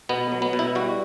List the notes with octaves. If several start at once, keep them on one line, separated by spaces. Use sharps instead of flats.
B2 B3
F#3
B3
B2
E4
G3 F#4